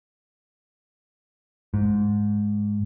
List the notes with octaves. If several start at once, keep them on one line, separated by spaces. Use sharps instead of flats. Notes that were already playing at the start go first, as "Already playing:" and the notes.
G#2